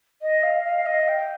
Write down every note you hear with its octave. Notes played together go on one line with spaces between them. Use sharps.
D#5
F5
F5
D#5
G5